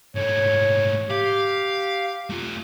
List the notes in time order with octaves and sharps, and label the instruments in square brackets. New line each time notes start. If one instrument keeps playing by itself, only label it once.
[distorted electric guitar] G#2 A3 [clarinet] C#5
[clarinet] G4 [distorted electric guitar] F5
[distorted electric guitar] A3 F4